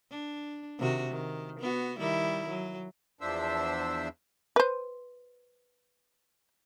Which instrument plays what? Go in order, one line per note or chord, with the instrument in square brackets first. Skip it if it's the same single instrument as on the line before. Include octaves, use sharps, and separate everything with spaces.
[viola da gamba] D4
C3 D#3 F#4
D#3
B3 F#4
D#3 G3 E4
F#3
[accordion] E2 F3 D4 C5 E5 E6
[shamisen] B4 C5